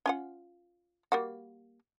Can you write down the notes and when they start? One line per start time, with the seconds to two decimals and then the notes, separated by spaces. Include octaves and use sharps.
0.06 C#4 F4 F#5
1.12 G3 A#3 F#4